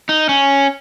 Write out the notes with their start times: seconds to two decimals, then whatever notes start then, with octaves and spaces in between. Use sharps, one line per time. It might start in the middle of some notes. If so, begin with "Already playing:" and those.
0.09 D#4
0.29 C#4